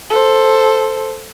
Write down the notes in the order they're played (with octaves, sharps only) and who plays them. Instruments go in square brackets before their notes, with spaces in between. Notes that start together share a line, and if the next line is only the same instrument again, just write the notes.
[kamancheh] A4 C5